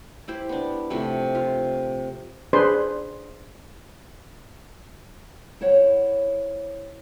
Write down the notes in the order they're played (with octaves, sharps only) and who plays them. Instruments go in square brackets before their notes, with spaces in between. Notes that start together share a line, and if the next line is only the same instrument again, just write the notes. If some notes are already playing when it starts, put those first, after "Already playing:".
[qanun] E4 G4 C5
B3 D4
C3 F3 A3
F4
[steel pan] D4 G#4 B4 C5 C6
[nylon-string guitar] E4 C5 C#5 F#5